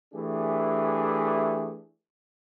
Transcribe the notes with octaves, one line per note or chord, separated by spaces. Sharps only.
E3 A3 D4 G4 G#4